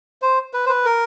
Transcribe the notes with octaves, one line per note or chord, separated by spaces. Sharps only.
C5
B4
C5
B4
A#4